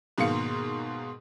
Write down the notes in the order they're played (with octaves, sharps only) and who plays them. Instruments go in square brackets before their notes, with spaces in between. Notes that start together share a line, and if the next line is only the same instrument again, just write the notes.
[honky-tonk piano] G#2 B2 D#3 A#3 F5 C#7